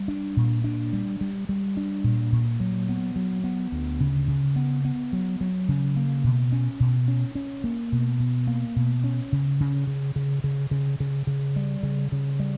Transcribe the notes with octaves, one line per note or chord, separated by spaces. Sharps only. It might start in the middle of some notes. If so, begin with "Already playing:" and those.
Already playing: G3
D4
A#2
D4
G3
G3
G3
D4
A#2
A#2
F#3
B3
F#3
B3
D2
C#3
C#3
B3
B3
F#3
F#3
C#3
A#3
B2
C#4
B2
C#4
C#4
A#3
B2
B2
A#3
B2
C#4
C#3
C#3
C#3
C#3
C#3
C#3
C#3
C#3
G3
C#3
C#3
G3